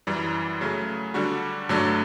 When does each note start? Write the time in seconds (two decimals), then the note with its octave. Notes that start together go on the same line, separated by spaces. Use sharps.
0.07 F#2 E3 G3
0.61 C#3 F#3 A3
1.14 D3 G3 D4 F#4
1.69 G2 D3 F#3 A3 D4